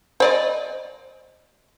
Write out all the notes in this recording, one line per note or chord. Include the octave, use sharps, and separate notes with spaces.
C5 D5 D#5